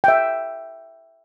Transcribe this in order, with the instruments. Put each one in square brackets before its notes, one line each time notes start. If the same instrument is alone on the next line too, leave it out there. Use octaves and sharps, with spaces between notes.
[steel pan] E5 G5